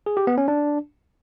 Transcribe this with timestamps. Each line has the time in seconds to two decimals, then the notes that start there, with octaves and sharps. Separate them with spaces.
0.06 G#4
0.17 G4
0.27 B3
0.38 C#4
0.48 D4